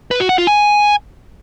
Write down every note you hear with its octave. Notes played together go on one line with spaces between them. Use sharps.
B4
F#4
F#5
F4
G#5